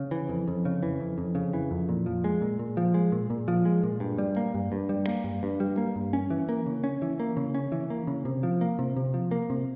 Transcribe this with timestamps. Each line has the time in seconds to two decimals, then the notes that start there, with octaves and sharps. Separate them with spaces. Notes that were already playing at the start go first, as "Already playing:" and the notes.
Already playing: C#3
0.11 E3
0.29 F2
0.48 F2
0.65 C#3
0.83 E3
1.00 F2
1.18 F2
1.35 C#3
1.53 E3
1.71 F2
1.89 A#2
2.06 F3
2.24 G#3
2.41 A#2
2.59 A#2
2.77 F3
2.94 G#3
3.12 A#2
3.30 A#2
3.48 F3
3.65 G#3
3.83 A#2
4.00 G2
4.18 G3
4.36 A#3
4.54 G2
4.72 G2
4.89 G3
5.07 A#3
5.24 G2
5.43 G2
5.60 G3
5.78 A#3
5.96 G2
6.13 C#4
6.30 E3
6.49 A#3
6.66 C#3
6.84 C#4
7.02 E3
7.20 A#3
7.37 C#3
7.55 C#4
7.72 E3
7.90 A#3
8.07 C#3
8.25 C3
8.43 F3
8.61 A#3
8.79 C3
8.96 C3
9.14 F3
9.31 A#3
9.50 C3